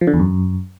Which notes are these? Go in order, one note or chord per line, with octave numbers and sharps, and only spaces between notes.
F3
D3
E2
F#2